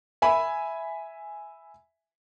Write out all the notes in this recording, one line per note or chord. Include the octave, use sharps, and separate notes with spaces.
E5 G#5 B5